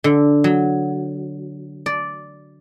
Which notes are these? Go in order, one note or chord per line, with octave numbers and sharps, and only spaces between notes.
D3
F#3
D5